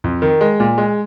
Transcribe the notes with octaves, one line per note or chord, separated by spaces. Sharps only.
F2
D#3
G#3
A#2
G#3